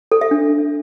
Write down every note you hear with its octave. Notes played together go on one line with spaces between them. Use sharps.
A4
E5
D4